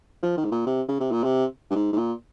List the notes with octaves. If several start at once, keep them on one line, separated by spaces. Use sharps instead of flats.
F3
D#3
G#2
A#2
C3
C#3
C3
A#2
C3
G2
G#2
G#2
A#2